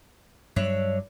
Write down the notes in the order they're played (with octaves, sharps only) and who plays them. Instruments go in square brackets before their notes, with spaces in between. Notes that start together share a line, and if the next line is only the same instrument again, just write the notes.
[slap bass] G2 F#3 [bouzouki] D4 C#5 E5